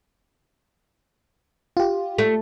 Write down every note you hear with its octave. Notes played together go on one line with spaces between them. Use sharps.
F4 G4
A3